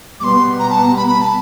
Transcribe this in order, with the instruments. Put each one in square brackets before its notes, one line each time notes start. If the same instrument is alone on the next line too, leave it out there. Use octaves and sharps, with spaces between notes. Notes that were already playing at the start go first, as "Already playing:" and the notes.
[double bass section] B2 G3 B3 [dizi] C6 D6
[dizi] A#5
A5
A#5
B5
B5
A5